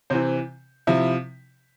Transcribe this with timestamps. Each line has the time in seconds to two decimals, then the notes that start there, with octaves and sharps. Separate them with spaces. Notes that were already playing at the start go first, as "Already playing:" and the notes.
0.10 C3 E3 C4 C5
0.87 C3 F3 E4 E5